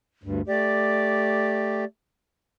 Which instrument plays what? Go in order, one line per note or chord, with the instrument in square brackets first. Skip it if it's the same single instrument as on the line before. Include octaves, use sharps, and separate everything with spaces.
[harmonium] D2 G2
[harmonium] A3 G4 [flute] D5